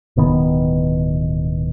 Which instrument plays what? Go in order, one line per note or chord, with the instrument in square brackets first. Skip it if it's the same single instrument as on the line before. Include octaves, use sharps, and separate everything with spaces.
[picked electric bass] D1 B2 D#3 B3